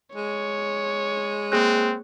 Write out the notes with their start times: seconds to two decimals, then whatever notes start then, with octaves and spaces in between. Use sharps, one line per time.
0.15 G#3 C#5
1.52 A#3 C4 G#4 F#6